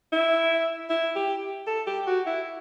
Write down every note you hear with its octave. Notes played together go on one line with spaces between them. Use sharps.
E4
E4
G4
A4
G4
F#4
E4